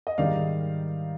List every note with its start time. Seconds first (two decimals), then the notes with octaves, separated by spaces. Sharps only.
0.07 D#5
0.18 G#2 D#3 G3 D5 F5